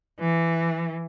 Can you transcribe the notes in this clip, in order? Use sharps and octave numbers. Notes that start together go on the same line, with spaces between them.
E3